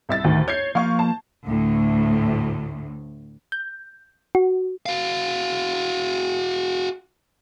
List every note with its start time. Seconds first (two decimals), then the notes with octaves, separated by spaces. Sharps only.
0.09 C2 E5 A6
0.24 D2 A2 D#3
0.48 C#5 G6 G#6 C7
0.75 F3 A#3 F5 C#6
0.99 A5
1.45 D2 A2
3.52 G6
4.35 F#4
4.86 F#4 F5